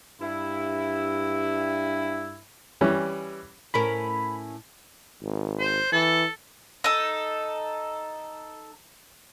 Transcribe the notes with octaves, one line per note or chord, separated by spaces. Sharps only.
G2 E4
E3 G3 C#4
A2 C#4 A#4 B5
G#1
C5
E3 A4
D#4 A4